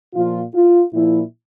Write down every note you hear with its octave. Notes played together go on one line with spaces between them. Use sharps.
A#2 F3 F4
F4
A#2 F3 E4